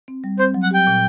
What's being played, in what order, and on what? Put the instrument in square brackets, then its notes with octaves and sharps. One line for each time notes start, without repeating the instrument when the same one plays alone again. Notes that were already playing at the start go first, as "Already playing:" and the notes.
[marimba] C4
G3
[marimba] C4 [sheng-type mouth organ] C5
[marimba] F#3
[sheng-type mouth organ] F#5
[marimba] G4 [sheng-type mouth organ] G5
[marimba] A#2